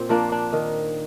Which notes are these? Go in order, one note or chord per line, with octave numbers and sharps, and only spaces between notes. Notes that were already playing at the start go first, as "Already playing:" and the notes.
Already playing: A#2 C4
F3 A#3 D4
D4
D#3